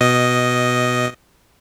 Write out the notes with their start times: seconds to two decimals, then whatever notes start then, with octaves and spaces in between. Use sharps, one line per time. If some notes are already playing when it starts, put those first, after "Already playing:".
0.01 B2 D#5